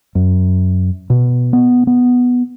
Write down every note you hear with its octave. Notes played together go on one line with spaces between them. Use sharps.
F#2
B2
B3
B3